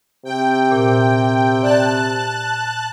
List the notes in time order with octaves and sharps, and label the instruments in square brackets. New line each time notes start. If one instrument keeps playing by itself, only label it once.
[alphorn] C3 [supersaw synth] G5
[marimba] A#2
[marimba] D5 [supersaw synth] A5 F#6